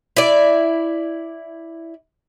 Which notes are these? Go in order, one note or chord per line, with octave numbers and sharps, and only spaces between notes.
E4 D5